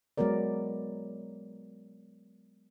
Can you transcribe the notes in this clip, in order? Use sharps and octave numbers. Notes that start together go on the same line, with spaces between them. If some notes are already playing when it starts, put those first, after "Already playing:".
F#3 G#3 B3 A#4 D5